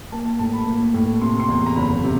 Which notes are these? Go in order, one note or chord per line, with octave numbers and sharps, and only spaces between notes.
A#3 A5
A5
A2 A5
B5
A#3
A2
C3 C6
C6
E2
A#5
F#1 B5
C3